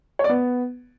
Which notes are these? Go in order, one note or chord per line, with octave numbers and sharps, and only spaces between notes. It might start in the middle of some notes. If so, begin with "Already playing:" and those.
C#5
D5
B3